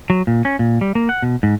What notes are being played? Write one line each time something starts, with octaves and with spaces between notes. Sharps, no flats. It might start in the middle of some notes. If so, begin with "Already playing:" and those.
F#3
A#2
C#4
A#2
G3
A#3
F#5
B2
G#2